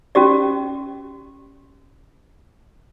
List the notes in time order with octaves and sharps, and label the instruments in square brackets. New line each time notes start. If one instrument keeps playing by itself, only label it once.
[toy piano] C#4 F#4 G4 D5